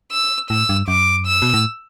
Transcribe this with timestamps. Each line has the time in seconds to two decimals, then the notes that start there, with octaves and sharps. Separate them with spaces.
0.11 E6
0.50 A2 E6
0.69 G2
0.88 F#2 D6
1.27 E6
1.42 B2
1.54 A2